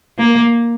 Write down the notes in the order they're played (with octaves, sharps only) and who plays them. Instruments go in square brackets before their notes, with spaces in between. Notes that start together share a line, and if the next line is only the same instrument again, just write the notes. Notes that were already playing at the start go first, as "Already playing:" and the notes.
[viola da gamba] A#3